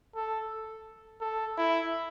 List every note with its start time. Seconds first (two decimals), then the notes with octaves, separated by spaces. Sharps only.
0.15 A4
1.21 A4
1.58 E4